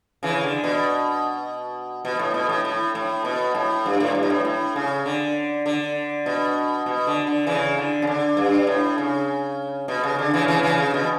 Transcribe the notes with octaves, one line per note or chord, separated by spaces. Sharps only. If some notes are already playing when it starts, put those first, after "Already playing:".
C#3 E3
D3
B2
B2
A2
B2
A2
A2
A2
B2
A2
G2
A2
G2
B2
A2
A2
C#3
D3
D3
B2
B2
D3
D3
C#3 E3
D3
C#3
D3
G2
A2
C#3
B2
C#3
D3
C#3 E3
C#3 E3
C#3 E3
C#3
B2